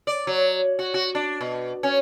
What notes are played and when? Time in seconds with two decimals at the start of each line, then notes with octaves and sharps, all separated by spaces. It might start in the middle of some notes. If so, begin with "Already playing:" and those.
0.07 D5
0.27 F#3
0.79 F#4
0.94 F#4
1.15 D4
1.41 B2
1.83 C#4